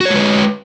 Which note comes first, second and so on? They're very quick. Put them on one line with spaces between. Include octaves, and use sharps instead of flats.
F#4 C#5 G#3 B4